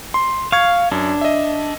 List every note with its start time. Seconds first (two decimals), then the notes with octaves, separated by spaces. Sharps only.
0.14 C6
0.52 F5 C#6 G#6
0.92 F#2 D4
1.21 D#5 E5